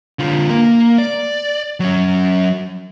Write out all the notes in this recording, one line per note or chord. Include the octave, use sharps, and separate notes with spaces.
D3 F4
A#3
D5
F#3 C#4